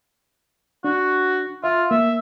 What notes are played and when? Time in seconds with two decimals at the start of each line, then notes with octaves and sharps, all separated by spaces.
0.84 D4 F#4
1.64 F4 E5
1.91 A#3 E5